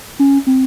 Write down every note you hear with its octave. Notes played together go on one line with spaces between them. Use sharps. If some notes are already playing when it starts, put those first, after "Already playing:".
C#4
C4